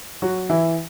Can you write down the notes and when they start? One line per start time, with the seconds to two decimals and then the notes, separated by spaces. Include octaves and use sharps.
0.22 F#3 F#4
0.49 E3 E4